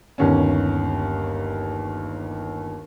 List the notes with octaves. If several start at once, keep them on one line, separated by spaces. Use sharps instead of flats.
G1 D#2 C#4